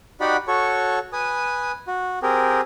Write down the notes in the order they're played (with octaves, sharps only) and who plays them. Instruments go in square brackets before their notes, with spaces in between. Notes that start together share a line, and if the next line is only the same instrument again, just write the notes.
[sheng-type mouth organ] D#4 F#4 G4 D5 F#5 B5
F#4 A4 C#5 C#6
B4 G#5 D#6
F#4
C4 G4 G#4 A#4